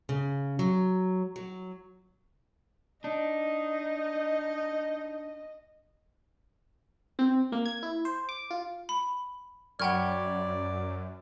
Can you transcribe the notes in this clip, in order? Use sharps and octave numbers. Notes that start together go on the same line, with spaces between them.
C#3
F#3
F#3
D4 D#4 D#5
C4
A#3
G#6
E4
C5
D6
F4
B5
F#2 D5 F#5 G5 B5 C#6 F6 G#6